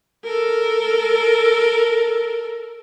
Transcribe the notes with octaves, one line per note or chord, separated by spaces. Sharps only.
A4 A#4